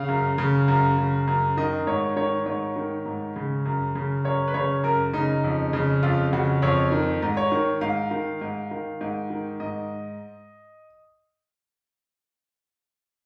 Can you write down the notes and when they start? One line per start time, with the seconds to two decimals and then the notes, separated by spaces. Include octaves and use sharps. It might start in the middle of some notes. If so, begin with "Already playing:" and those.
Already playing: C#3 F5
0.08 F#2
0.38 C#3
0.68 F#2
0.98 C#3
1.27 F#2
1.57 D#3 D#5
1.87 G#2 C#5
2.16 D#3 C#5
2.46 G#2 C#5
2.76 D#3
3.05 G#2
3.36 C#3
3.65 F#2
3.95 C#3
4.24 F#2 C#5
4.48 B4
4.54 C#3 C#5
4.84 F#2 A#4
5.13 C#3 D#4
5.44 F2
5.73 C#3
6.03 F2 F4
6.33 C#3 F#4
6.62 F2 C#5
6.92 D#3
7.22 G#2
7.37 C#5
7.52 D#3
7.81 G#2 F5
8.11 D#3
8.41 G#2
8.71 D#3
9.01 G#2
9.30 D#3
9.60 G#2 D#5